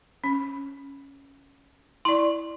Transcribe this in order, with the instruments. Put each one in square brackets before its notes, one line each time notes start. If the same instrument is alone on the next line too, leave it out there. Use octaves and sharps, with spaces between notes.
[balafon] C#4
[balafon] E4 D5 [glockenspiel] C6